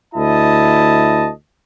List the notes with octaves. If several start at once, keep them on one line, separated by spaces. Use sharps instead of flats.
D2 E4 D#5 A5